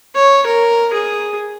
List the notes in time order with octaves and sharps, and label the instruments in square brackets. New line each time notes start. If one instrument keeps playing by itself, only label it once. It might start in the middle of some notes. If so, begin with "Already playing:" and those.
[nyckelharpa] C#5
A#4
G#4